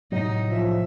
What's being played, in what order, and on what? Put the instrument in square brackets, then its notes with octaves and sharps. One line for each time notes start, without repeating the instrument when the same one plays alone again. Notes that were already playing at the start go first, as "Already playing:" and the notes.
[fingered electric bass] A2 C3 F#3 [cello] D#4
[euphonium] F3 [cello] E5